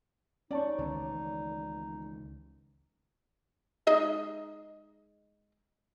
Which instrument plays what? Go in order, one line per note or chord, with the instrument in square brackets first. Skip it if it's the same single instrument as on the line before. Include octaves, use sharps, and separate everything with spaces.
[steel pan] C#4 A5 C#6 [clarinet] D#4 [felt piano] D5
[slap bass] C#2 D#3 E3 [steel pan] C#5
[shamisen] G#3 D#4 D#5